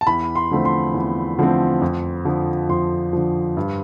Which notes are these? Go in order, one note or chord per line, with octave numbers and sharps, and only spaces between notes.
A5
E2 B5
C6
D3 F3 A3 C4
C6
E2
D3 F3 A3 C4
F2
D3 F3
F2 C6
D3 F3
G2